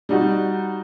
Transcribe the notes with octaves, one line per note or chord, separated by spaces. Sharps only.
G3 D#4 F#4